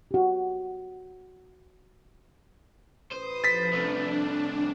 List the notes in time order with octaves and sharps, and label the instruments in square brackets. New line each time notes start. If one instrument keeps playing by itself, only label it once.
[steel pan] F#4 G4
[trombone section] A1 B4 [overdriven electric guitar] C5 [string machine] D#6
[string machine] F3 [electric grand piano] A6 B6
[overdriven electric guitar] C2 A3 [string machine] D4